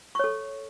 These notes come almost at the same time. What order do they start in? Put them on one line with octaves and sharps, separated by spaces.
C#6 C#5 A4